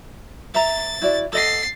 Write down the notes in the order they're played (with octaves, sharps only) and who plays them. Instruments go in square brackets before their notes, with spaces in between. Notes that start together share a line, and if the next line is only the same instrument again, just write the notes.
[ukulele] E5 A#5 [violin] A6
[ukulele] E4 F#4 D5
[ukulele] A4 D#5 F#5 [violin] A6 C7